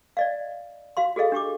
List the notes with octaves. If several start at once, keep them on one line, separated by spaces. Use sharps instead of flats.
D5 D#5 F5
F#4 F5 C6
F#4 G#4 A4 D#5 F5
D4 G4 C#6 D6